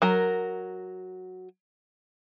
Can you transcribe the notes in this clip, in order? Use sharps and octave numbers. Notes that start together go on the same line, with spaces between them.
F#3 A#4